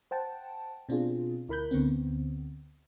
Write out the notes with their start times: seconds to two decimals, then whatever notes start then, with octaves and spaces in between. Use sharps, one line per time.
0.11 C5 F#5 G5 A5
0.89 B2 C4 D4 F4 G#4
1.48 D2 E4 A#4 B5 F#6 G6
1.71 D2 D3 B3 C4